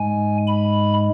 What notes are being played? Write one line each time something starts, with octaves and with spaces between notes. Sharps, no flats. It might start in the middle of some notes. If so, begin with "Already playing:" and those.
Already playing: G#2 G#3 G#5
B5